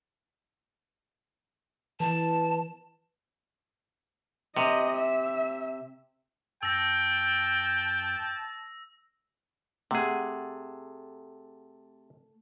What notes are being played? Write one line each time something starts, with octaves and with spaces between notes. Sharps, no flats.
E3 A5
C3 D#5
E5
F#2 G5 A5 E6 A#6
C3 A3 G#4 F#5